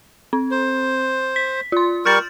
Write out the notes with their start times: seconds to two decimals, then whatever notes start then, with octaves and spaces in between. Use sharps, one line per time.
0.33 C4
0.51 C5
1.36 B6
1.72 F4 C6
2.05 G3 A#4 C#6 F6 G6 A6